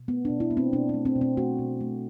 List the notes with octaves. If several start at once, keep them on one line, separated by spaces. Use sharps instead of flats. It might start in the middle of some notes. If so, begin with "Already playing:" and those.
Already playing: B2
A3 B3
B2 D4
E4
A3 B3
C4
B2 D4
A3 C4
C4
B2
C4
A3 F#4
B2
A3